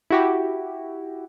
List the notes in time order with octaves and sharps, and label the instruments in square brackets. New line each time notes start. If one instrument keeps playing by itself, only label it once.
[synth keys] E4 F#4 G4